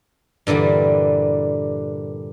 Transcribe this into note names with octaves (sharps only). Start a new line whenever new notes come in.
G2 A#2 D3 E3 G3